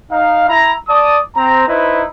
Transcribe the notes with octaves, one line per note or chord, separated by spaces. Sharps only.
D#4 F5
E4 A#5
D5 A5 D#6
C4 A#5
D#4 E4 B4 C5